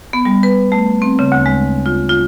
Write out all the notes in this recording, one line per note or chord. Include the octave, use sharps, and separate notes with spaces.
B3
G3
B4
A3
C4
C#3
D2
G#3
F4
F4